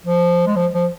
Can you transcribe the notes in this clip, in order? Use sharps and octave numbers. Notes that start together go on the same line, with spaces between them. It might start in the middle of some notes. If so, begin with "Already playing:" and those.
F3
G#3
F3
F3